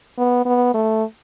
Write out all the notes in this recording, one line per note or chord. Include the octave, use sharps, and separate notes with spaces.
B3
B3
A3